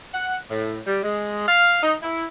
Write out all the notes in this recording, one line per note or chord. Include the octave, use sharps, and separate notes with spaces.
F#5
A2
G3
G#3
F5
D#4
E4